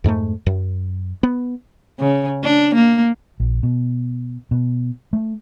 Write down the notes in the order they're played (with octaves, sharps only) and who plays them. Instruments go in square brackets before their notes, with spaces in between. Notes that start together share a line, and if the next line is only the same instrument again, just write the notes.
[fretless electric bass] F2 G#2 G3 A3
F#2
B3
[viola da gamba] C#3
D4
A#3
[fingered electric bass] A#1
B2
B2
A3